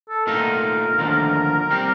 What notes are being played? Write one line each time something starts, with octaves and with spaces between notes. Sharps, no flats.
A4
A#2 A3 D#4 A#4
D#2 D3 F3 A3
G3 C4 G4